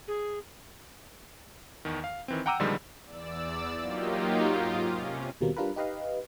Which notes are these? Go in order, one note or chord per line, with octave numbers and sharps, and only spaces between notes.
G#4
E2 D#3
F5
D#3 E3 C4
F#5 G5 A#5 D6 E6 D#7
A#2 D3 D#3 F3 G3 G#3
E2 D5 E6
F#3 A#3 D#4 F4 G4
G#2 F4 D6 D#6
C3 C#4
D#2 B2 G3 A#3 C4
G3 D4 F4 A#4 B4
D#4 G4 B4 D#5 F5